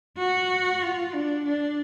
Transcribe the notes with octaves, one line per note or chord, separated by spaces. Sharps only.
F#4
F4
D4
D4